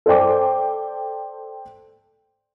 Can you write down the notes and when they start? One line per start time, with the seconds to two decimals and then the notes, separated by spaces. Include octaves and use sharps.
0.06 A4 C5 D5 G5 D6